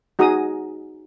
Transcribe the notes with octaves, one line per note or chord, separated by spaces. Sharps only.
D#4 F#4 G#4 A#5 D#6